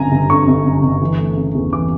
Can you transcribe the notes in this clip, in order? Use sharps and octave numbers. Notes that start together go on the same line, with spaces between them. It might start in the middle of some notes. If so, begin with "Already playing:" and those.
Already playing: G1 F#2 D3 G#5 A#5
G1
D3 C#6
G1
F#2
G1
E3
A3
C#3
E2
E3 D6